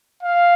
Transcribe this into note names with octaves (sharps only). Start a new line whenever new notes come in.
F5